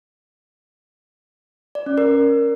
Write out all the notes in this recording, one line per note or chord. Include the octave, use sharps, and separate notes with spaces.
D5
C#4
A#4